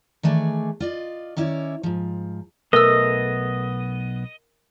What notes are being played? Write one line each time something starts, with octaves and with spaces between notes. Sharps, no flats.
D#3 E3 A3 G#4 D5
F4 D5 D#5
D#3 C#4 E4 C#5 D5
G#2 F3
B1 A3 B3 A#4 D#5 E6